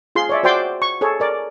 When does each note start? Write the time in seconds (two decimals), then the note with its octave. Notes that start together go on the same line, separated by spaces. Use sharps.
0.15 F4 G#4 C6
0.29 C#5 D5 E5
0.43 F#4 C5 D5 G5 C6 D6
0.82 C#6
1.01 G#4 A4 C#5
1.20 A#4 D5